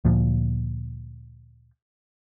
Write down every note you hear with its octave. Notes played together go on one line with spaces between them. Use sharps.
D2 A#2 F3